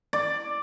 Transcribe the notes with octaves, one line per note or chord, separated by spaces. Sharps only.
D5